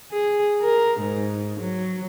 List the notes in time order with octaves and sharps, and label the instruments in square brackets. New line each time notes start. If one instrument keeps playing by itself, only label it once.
[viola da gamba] G#4
A#4
G#2
F#3